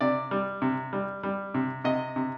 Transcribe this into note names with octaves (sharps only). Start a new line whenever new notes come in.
C3 D5
G3
C3
G3
G3
C3
C3 D#5
C3